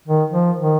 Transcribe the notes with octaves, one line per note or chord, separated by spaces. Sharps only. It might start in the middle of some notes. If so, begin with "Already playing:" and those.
D#3
F3
D#3